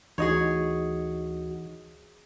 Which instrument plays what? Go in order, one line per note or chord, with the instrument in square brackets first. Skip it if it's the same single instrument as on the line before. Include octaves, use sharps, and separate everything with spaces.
[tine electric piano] D2 F#4 [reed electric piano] E3 D#4 D#5 [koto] G#4 C#5